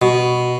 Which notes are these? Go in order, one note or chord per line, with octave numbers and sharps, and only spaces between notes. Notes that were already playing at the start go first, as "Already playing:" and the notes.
B2